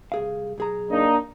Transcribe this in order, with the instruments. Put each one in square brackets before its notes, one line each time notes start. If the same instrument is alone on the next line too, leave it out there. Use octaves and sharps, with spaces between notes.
[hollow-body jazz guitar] C2 G#4 F5
B1 G#4 A#5
[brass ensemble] A#3 D4 D#4